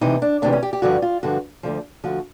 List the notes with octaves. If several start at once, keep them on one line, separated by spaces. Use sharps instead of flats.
D2 C3 E3 D#4
D4
D2 C3 E3 D4
C#4
G4
G4
G2 D3 F3 F#4
F4
G2 D3 F3 F#4
D2 D3 F3
D2 D3 F3 F#4